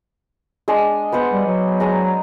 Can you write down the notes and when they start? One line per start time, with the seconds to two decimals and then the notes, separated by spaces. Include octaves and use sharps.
0.68 G#3 D4
1.12 B3 C5 F#5
1.32 G3
1.47 F#3
1.80 G#3 D4 A#5